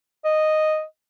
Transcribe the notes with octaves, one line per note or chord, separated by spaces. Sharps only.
D#5